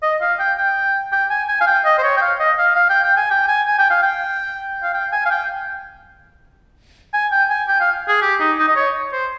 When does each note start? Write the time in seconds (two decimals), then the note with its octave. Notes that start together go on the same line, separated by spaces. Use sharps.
0.02 D#5
0.21 F5
0.39 G5
0.58 G5
1.12 G5
1.30 G#5
1.49 G#5
1.61 F5
1.67 G5
1.85 D#5
1.98 C5
2.03 C#5
2.17 G5
2.21 F5
2.40 D#5
2.58 F5
2.76 F5
2.90 G5
3.04 G5
3.17 G#5
3.31 G5
3.48 G#5
3.67 G#5
3.79 G5
3.91 F5
4.03 G5
4.83 F5
4.94 G5
5.12 G#5
5.26 F5
5.30 G5
7.13 G#5
7.31 G5
7.50 G#5
7.68 G5
7.81 F5
8.08 G#4
8.22 G4
8.40 D#4
8.59 D#4
8.68 D#5
8.76 C#5
9.13 C5